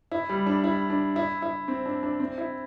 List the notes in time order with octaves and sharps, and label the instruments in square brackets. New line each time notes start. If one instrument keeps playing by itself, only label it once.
[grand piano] E4
G3
D4
E4
D4
E4
E4
C4
D4
D4
C4
E4